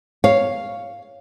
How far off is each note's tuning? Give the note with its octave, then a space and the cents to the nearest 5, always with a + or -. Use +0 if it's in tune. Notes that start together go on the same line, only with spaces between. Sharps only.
C#5 +0 F5 +0